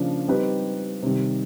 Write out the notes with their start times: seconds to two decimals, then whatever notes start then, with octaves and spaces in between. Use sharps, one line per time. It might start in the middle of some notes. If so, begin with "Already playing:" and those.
Already playing: C#3 F3 A#3 D4 F4
0.28 G3 C4 D#4 G4 B4
1.03 C3 D#3 G3